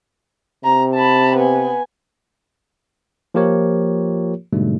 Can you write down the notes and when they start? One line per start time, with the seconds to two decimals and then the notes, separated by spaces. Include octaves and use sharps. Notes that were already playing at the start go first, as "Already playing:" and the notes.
0.64 C3 A#5
0.94 A5 B5
1.37 B3 G#5
3.34 F3 A#3 F4 G4 A#4 C#5
4.53 G#2 B2 D3 G3 A3